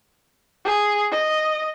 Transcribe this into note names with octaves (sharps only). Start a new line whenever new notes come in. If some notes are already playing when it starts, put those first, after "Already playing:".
G#4
D#5